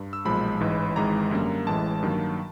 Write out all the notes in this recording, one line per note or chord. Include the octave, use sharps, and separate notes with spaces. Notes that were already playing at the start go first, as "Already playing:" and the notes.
Already playing: G2
E6
B1 A#2 F3 G#3 B5
A1 G#2 E3
G#1 G#2 E3 G#3 A#5
F#2 D3 G3 A#3
A1 A2 E3 G#3 A5
G2 D#3 F#3 A#3